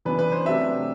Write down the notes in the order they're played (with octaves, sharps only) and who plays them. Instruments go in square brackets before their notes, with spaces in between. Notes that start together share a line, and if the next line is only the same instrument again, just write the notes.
[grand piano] F#2 E3 B3 D4 B4
B4
C5
C3 F#3 A3 D4 E5